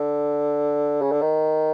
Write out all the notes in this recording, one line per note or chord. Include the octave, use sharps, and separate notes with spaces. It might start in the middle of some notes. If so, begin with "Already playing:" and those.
Already playing: D3
C#3
D3
D#3